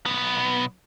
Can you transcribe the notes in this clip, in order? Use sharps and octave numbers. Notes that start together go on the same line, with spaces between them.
B1 B3